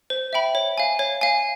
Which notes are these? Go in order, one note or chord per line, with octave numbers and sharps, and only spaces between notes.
C5
E5 G5 B5
C#5
F5 G#5
C#5
F5 G#5